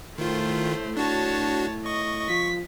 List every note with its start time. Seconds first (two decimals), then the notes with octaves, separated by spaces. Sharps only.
0.18 A2 D#3 A3 F4 C5
0.97 D4 F#4 C#5 A5
1.86 D#5 C#6
2.29 F3 B6